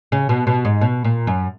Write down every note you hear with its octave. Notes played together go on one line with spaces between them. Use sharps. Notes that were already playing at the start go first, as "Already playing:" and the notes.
C#3
B2
B2
G#2
B2
A#2
F#2